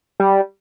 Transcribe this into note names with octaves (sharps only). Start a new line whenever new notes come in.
G3